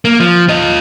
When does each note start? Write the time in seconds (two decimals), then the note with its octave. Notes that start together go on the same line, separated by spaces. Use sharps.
0.05 A#3
0.20 F3
0.49 F4 D#5